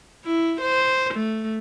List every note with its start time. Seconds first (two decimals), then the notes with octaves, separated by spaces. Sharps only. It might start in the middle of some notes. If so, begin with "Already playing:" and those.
0.25 E4
0.62 C5
1.15 A3